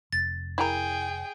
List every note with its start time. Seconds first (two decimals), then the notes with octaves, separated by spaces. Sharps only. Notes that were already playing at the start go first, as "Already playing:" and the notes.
0.12 F1 A6
0.58 E4 G#4 A#4 G5